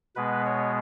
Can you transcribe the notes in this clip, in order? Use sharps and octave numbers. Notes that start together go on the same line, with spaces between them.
B2 G#3 B3 B4
C#5